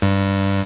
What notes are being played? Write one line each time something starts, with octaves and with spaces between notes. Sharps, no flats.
G2